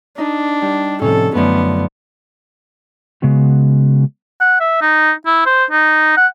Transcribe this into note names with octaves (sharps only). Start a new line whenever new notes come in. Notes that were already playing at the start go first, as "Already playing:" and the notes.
D4 D#4
G3
A2 C3 F3 C#4 A4
F#2 D3 F3 A3 B3
C#3 G#3 B3 F#4
F#5
E5
D#4
E4
C5
D#4
F#5